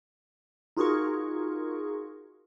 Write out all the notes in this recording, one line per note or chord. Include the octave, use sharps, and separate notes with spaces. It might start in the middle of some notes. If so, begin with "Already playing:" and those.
D#4 F4 F#4 G#4 A#4 C#6